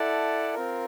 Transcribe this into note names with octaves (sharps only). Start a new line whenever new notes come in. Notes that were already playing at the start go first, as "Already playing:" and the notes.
Already playing: E4 A4 D5 F#5 A5
C4 F4 A#4